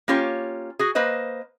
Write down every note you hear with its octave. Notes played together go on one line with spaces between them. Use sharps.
A#3 C#4 F4 G4 C#5
F#4 G#4
A#3 B4 C5 D#5